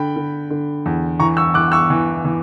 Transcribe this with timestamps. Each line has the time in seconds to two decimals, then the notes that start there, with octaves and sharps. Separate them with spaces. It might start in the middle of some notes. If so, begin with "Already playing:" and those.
Already playing: D3 G5 B5
0.16 D3
0.50 D3
0.86 E2
1.20 E3 A#5 C#6
1.37 C#6 E6
1.54 E3 D6 F#6
1.72 C#6 E6
1.90 E3
2.25 E3